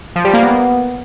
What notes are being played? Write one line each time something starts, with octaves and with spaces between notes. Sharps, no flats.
F3
G3
A#3
B3